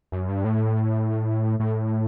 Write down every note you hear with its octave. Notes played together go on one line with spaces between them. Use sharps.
F#2
G2
A2
A2